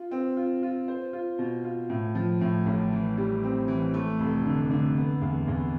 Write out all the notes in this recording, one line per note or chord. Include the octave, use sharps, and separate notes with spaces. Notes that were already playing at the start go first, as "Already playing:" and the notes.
Already playing: F4
C4
F4
F4
C5
F4
B2
F4
A2
F3
A2
A1
E3
G3
C4
E3
A3
F1
D3
D3
B3
E2
E2